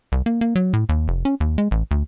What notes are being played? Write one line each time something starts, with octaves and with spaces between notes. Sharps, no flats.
C2
A#3
A#3
F#3
A2
D#2
F1
C#4
D#2
G#3
A1
D2